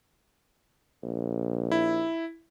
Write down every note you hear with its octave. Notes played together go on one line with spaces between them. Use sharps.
A#1
E4